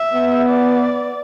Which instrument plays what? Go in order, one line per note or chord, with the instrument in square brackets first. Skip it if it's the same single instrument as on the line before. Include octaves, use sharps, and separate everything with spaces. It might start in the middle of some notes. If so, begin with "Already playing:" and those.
Already playing: [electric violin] E5
[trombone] B3
[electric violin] D5